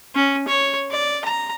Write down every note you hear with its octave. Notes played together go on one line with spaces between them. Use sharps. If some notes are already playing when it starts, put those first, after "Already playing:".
C#4
C#5
D5
A#5